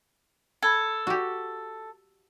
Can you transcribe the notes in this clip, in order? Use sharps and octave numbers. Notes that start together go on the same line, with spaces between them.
A4 B5 G#6
F#4 G4